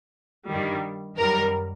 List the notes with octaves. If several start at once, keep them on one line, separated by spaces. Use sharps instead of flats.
G2 D#3 G3
F#2 D#3 G3 A#4